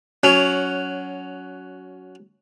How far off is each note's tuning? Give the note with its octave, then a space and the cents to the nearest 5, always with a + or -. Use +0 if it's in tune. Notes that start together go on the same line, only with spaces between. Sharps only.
F#3 +0 C#4 +20